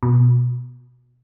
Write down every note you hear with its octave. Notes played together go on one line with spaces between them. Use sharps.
B2